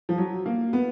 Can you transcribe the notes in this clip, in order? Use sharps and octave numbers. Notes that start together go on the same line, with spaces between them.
F3
F#3
A#3
B3